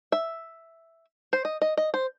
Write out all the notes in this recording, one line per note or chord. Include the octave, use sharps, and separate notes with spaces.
E5
C5
D#5
D#5
D#5
C5